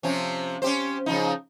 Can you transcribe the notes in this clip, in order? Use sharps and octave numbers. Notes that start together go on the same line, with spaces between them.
C3 F3 C#4
C#4 G4 C5
C#3 F3 D#4